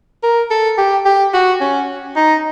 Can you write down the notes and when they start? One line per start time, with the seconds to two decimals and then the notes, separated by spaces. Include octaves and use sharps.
0.23 A#4
0.50 A4
0.78 G4
1.06 G4
1.34 F#4
1.61 C#4
2.16 D#4